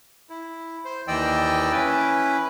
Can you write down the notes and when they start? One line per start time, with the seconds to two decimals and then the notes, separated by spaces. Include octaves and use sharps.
0.30 E4
0.85 C5
1.08 D#2 E3 D5 D#5 G5 E6
1.72 C#4 E4 B4